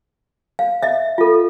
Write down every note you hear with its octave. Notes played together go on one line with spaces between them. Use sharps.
F5
D#5 E5
F4 A4